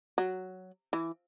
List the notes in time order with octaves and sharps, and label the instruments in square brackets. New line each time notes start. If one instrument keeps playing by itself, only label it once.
[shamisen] F#3
E3